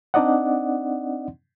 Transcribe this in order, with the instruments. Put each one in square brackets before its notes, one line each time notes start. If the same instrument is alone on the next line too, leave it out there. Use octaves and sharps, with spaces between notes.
[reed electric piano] C4 D4 D#4 D5 D#5 F#5